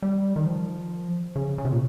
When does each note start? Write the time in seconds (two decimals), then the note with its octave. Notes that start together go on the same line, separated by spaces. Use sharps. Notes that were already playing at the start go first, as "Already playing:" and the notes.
0.02 G3
0.36 D#3
0.46 F3
1.36 C#3
1.58 C#3
1.65 C3
1.72 A#2